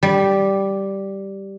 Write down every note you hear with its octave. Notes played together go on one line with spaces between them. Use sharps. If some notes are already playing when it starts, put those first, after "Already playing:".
G3